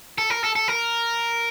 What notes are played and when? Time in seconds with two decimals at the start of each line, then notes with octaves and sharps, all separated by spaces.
0.18 A4
0.30 A#4
0.44 A4
0.56 A4
0.68 A#4